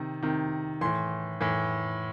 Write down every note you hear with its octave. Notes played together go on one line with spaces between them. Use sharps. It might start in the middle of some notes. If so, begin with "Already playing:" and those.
Already playing: C3 D#3
C3 D#3
A2 E3 C6
A2 E3